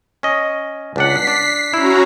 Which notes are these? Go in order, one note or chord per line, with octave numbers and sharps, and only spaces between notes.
C#4 D#5
C#2 D4 F#5 B6 C7
D4
C#4 E4 F#4 A#5